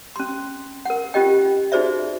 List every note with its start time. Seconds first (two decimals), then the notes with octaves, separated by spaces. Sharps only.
0.16 C#4 C6
0.85 A#4 F#5
1.14 C#4 F4 G4 D#5 G5
1.72 D#4 F#4 G#4 C5 D5 E5